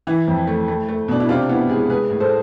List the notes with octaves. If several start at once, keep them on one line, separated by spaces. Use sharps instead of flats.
E3 E4
F2
A3
A3
A3
B2 D4
E4
C3 D4 F4
B3 E4
G#3 E4 G#4
G#3 G#4 B4
A2
A4 C5